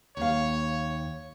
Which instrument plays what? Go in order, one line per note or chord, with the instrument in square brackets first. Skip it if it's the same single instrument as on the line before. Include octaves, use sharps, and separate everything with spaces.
[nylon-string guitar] D#2 F5 [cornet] C#5